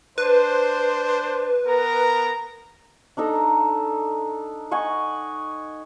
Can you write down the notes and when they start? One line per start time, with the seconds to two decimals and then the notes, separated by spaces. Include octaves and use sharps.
0.18 D4 B4 C5
1.66 B3 A#4 A#5
3.17 D4 D#4 A4 A#5
4.71 D#5 F#5 G#5 C#6